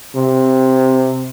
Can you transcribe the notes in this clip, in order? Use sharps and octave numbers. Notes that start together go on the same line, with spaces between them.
C3